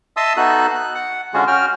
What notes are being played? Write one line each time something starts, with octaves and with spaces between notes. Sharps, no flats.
D#5 E5 A5 C6 D#6 E6
B3 D#4 F#4 A4 F#6
F#6
F#5
D3 G#3 C#4 F4 F#4 G#4
C#4 F#4 G5 F6